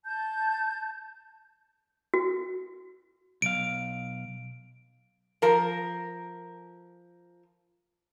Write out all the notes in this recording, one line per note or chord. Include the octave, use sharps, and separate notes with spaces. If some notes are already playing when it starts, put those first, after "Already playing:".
A5 G6
F#4
B1 F5 D7
F3 A#4